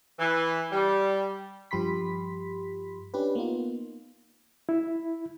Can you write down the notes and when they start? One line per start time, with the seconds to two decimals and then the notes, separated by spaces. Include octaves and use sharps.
0.19 E3
0.72 G3
1.71 G2 F3 G4 B5 C6 B6
3.14 C#4 D4 G4 B4
3.35 A#3 B3 D#4 F4
4.69 E4